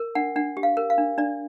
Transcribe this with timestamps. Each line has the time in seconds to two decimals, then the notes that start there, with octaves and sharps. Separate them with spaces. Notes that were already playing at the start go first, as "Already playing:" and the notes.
Already playing: A#4
0.15 D4 F#5
0.36 D4 F#5
0.57 G4
0.63 F5
0.77 A#4
0.90 F5
0.98 D4
1.18 D4 D5